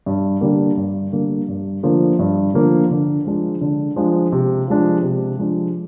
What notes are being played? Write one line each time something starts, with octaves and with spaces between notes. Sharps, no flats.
G2
D3 G3 A#3
G2
D3 G3 A#3
G2
D3 F3 A#3
G2
D3 F3 A#3
D3
F3 G#3 D4
D3
F3 G#3 D4
C3
F3 G#3 D4
C3
F3 G#3 D4